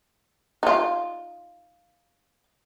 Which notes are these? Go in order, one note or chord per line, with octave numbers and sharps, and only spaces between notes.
D#4 F4